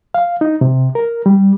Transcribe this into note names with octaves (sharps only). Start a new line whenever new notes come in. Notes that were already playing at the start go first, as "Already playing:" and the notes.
F5
D#4
C3
A#4
G3